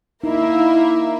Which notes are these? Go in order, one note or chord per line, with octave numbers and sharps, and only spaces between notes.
A#3 D#4 E4 A#4 E5